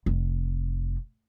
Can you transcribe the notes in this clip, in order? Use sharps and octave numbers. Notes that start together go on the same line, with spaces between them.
F1